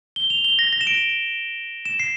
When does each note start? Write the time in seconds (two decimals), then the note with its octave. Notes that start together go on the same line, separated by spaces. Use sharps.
0.16 G7
0.30 F7
0.44 G7
0.59 A#6
0.73 A#6
0.81 E7
0.87 D7
1.85 E7
2.00 C7